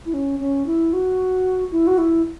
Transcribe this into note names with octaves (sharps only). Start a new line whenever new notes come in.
E4
C#4
C#4
E4
F#4
E4
F#4
E4